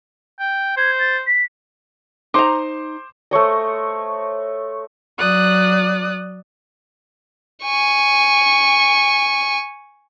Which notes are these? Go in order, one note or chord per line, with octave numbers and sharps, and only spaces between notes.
G5
C5 G#6
A6
B6
D#4 C5 A#5 C6 D6
A3 C5 C#5 D#5
F#3 D5 D#6 F#6
G#5 C#6